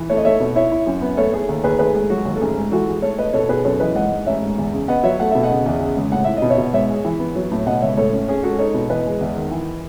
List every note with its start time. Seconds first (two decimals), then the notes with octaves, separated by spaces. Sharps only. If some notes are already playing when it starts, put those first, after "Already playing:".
Already playing: E3
0.10 A3 C#5
0.17 D#5
0.25 A3 C#5 E5
0.40 B2
0.56 E4 C#5 E5
0.72 E4
0.87 F#2
1.02 B3
1.17 A3 A4 C#5
1.32 A3 G#4
1.49 D#2
1.64 D#2 G#4 B4
1.79 A3 G#4 B4
1.94 G#2 G#4
2.10 F#3 F#4
2.25 D#2
2.35 A4
2.41 A1 G#4
2.57 G#2
2.72 E3 F#4 A4
2.88 G#3
3.02 A3 A4 C#5
3.18 A3 B4 D#5
3.33 B2 A4 C#5
3.49 B2 G#4 B4
3.65 F#2 A4 C#5
3.80 E3 B4 D#5
3.95 G#2 D#5 F#5
4.12 G#2
4.26 A1 C#5 E5
4.42 G#2
4.58 E2
4.73 C#3
4.88 B3 D#5 F#5
5.03 F#3 C#5 E5
5.19 A3 F#5
5.31 B2 E5
5.43 D#5 F#5
5.51 C#3
5.66 E2
5.81 C#3
5.97 C#2
6.12 A2 F#5
6.24 E4 E5
6.37 D#5
6.42 B2
6.50 C#5 E5
6.58 B2
6.73 G#2 C#5 E5
6.89 G#3
7.05 E3
7.20 B3
7.35 F#3
7.51 A2
7.67 B2 D#5 F#5
7.81 C#2 C#5 E5
7.97 A2 A4 C#5
8.13 C#4
8.28 C#4 G#4
8.43 G#3 F#4 A4
8.59 D#4 A4 C#5
8.74 B2
8.89 E3 B4 D#5
9.06 G#3
9.21 E2
9.36 D#3
9.51 E3